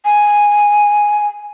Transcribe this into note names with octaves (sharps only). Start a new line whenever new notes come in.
G#5